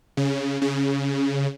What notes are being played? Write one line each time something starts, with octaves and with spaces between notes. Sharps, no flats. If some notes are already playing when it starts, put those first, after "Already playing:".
C#3
C#3